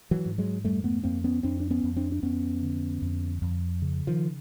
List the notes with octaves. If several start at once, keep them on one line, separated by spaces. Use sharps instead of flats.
E3 F#3
G#2
F#3 G#3
F2 G3 A3
A3 B3
F2 A#3 C4
B3 C#4
F2 C4 D4
D4
B3 C#4
F2
C4 D4
D4
F2 B3 C#4
D3
F2
F2
C#3
D#3 F3